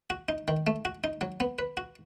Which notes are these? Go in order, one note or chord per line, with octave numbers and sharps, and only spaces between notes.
F#4
D#4
D#3
A3
F#4
D#4
F#3
B3
B4
F#4